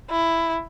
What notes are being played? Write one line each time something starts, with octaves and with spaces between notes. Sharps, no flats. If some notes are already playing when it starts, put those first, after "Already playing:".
E4